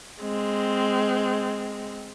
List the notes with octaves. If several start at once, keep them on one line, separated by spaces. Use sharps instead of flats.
G#3 C4